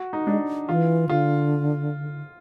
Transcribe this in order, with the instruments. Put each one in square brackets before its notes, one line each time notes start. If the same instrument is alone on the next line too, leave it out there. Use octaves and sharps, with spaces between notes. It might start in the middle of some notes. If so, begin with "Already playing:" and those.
Already playing: [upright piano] F#4
D#4
[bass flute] G#3 [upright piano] D4
[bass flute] E3 [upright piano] F4
[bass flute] D3 [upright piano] F4